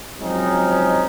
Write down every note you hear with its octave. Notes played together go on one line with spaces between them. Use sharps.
F3 F#3 G#3 C4 C#4 D#4